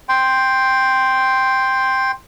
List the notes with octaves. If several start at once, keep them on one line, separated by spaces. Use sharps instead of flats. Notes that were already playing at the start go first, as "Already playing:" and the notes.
G5 C6